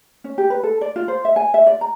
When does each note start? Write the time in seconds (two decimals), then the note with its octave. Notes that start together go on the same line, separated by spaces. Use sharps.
0.24 C#4
0.38 G4
0.50 B4
0.63 A4
0.81 D5
0.96 F4
1.08 C5
1.25 E5
1.36 G#5
1.54 E5
1.66 D5
1.81 A#5